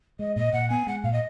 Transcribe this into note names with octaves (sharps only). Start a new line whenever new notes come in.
G#3 D#5
A#2 D#5
A#2 F#5
B3 G#5
G#3 F#5
A#2 F5
D#5